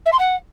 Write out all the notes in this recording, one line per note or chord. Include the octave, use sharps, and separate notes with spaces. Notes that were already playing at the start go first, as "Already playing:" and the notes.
E5
C6
F#5